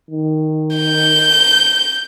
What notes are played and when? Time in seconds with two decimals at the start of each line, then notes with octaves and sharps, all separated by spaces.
0.11 D#3
0.76 G6